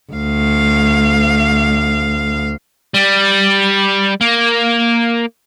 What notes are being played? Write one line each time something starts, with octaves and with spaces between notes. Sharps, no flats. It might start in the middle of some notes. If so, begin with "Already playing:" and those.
D2 F5
G3
A#3